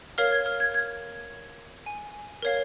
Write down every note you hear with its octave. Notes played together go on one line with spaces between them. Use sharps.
A#4 C#5 F5 F6
G#6
F6
G#6
G#6
G#5
A#4 C#5 F5